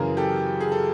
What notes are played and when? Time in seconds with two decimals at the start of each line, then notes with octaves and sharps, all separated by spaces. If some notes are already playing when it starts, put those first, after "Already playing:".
Already playing: F#2 C#3 E3 G#4 A#4
0.17 G4 A4
0.60 G#4
0.72 A4